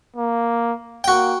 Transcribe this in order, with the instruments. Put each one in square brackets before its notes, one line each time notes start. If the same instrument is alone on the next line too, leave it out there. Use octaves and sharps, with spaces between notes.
[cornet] A#3
[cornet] A#3 [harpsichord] F#4 G5